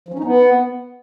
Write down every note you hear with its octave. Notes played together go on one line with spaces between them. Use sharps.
F3
C#4
D#4
B3